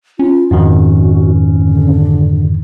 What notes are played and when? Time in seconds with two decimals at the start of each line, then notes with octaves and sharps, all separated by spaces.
0.19 C#4 F4
0.51 F2 G#2 D#3 F#4
1.65 D3